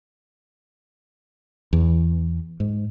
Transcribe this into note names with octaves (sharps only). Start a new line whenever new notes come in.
E2
G#2